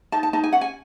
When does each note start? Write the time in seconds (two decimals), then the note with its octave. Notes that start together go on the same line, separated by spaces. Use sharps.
0.12 D#4 A5
0.23 A5
0.33 D#4 A5
0.44 G#5
0.52 C#4 F#5
0.61 G#5